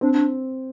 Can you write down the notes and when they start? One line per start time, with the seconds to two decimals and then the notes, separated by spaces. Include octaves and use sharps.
0.01 C4 D4
0.13 D4